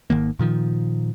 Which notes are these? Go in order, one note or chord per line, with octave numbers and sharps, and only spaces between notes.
G#1 D#3 A#3
A#2 D#3 F3